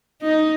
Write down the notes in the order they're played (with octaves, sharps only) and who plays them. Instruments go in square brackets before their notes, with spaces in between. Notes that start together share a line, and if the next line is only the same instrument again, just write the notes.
[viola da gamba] D#4